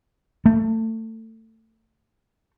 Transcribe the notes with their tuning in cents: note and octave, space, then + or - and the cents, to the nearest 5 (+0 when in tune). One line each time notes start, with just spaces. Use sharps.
A3 +25